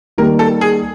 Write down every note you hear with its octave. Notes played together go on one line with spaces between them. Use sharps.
D#3 G3 A#3 A#4
A4
G#4